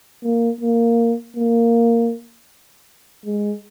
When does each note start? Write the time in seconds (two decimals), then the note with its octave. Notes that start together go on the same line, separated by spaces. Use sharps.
0.23 A#3
0.61 A#3
1.37 A#3
3.25 G#3